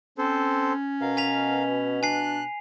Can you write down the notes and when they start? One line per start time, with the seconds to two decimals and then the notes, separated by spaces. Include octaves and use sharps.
0.18 C4 C#4 A4 C5
1.01 B2 A#4 F5
1.17 G#5 B6 F7
2.03 D4 G#5 F#6 C7